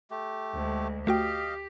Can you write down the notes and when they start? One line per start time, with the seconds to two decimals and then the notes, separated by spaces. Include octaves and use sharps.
0.11 A3 G4
0.54 D2 G#3
1.07 A3 F#4 G4 D#5 F5 G5